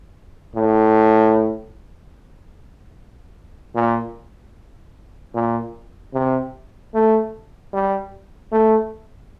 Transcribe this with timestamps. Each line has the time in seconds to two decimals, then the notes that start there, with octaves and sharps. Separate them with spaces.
0.55 A2
3.75 A#2
5.35 A#2
6.14 C3
6.94 A3
7.73 G3
8.52 A3